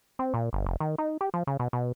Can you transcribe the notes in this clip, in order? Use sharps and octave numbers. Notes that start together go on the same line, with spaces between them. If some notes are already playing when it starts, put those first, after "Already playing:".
C4
A#2
G1
F1
D#3
D#4
G4
F3
C#3
B2
B2